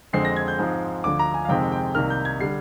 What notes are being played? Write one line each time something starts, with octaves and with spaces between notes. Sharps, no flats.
F2 D3 G#3 C4 C7
A#6
G#6
G6
G#2 F3 G#3 C4
D2 D3 F3 D6
A#5
G#5
F5
F2 C3 D#3 G#3 C4 G5
G5
C2 C3 D#3 A#3 F6
G6
G#6
D3 G3 C7